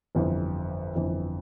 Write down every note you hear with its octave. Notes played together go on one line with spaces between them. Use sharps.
G1 F2 E3
G1 F2 E3